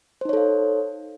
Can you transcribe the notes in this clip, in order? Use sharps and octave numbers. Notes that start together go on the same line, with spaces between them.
D#4 A4 C5 C#5 F5